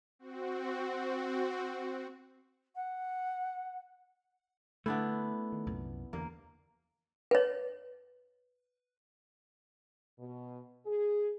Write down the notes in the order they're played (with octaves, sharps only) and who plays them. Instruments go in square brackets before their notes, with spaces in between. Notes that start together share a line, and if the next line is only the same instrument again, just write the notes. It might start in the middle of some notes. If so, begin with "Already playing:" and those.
[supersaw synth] C4 F#4
[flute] F#5
[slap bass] D3 [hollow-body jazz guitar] A3 [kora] B3 D4 E4
[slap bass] D#3
C2 F#2 A#2
[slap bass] E2 D3 [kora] A#3
[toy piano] B4 C#5
[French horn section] B2
G#4